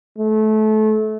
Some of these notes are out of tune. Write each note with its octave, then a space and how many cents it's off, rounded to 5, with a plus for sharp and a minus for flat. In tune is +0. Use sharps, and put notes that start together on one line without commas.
A3 -25